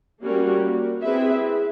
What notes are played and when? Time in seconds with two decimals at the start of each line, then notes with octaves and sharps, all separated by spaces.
0.22 G3 A#3 C#4 F#4 A#4
1.03 C4 E4 G#4 B4 E5